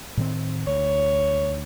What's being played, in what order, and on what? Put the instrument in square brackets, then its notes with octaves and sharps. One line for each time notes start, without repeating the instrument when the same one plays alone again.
[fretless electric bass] A2 D#3 C4
[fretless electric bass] D2 [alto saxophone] C#5